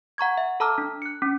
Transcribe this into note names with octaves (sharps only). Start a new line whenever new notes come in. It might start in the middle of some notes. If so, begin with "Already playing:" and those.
F#5 A#5 C#6 G#6
E5
A4 A5 A#5 D6 E6 F6
D4
F#6 C#7
C#4